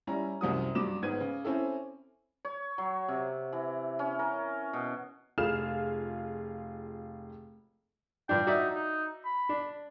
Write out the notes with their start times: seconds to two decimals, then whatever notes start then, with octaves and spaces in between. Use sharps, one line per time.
0.07 G3 C#4 E4 A#5
0.41 C2 F#2 C3 F#4 D#6
0.75 G2 F#3 D6 E7
1.02 G#1 G#2 B3 G#6 D#7
1.20 C#3
1.44 C4 C#4 E4 A4
2.45 C#5
2.78 F#3
3.08 C3
3.53 E3
3.99 C#4
4.19 A#4
4.73 B2
5.38 F1 F4 G#4 F6 E7
8.29 G2 F3 D4 G5
8.47 D#4 F#4 D5 E5
8.74 D#4
9.25 B5
9.49 D4